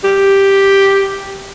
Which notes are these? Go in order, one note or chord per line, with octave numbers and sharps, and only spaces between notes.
G4